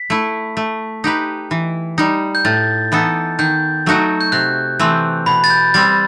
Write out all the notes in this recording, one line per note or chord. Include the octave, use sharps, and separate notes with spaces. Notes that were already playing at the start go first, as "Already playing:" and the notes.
Already playing: B6
A3 E4
A3
D#4 G4 B4
E3
G3 D#4
G6
A2 A6
E3 B3 D#4 A4
D#3 G6
F#3 A3 D#4 F#4
G6
C3 F#6
E3 A3 C4
B2 B5
A6
G6
G3 C4 A6